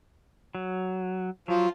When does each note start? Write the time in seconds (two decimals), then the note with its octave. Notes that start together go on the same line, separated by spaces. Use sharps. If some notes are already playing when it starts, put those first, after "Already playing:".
0.55 F#3
1.48 F3 F#3